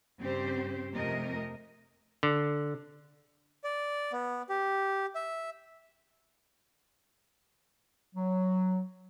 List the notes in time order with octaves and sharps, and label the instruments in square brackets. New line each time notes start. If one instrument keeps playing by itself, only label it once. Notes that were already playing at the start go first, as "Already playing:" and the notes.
[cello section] G2 C#3 C4 G4 C5
F2 C3 A3 A#4 D#5
[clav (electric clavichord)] D3
[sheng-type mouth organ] D5
B3
G4
E5
[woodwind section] F#3